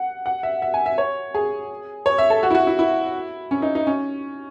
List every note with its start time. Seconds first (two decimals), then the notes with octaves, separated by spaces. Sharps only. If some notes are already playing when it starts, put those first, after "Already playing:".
Already playing: F#5
0.26 F#5
0.43 E5
0.62 E5
0.74 G#5
0.86 E5
0.98 C#5
1.35 G#4
2.06 C#5
2.18 E5
2.30 A4
2.43 F#4
2.51 E4
2.55 F#4
2.67 E4
2.79 E4
3.51 C#4
3.62 D#4
3.75 D#4
3.87 C#4